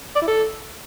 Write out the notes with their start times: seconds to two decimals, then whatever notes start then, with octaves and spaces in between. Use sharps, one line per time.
0.16 D5
0.22 E4
0.28 A4